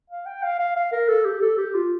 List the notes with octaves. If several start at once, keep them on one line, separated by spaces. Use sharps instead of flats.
F5
G5
F5
F5
F5
A#4
A4
G4
A4
G4
F4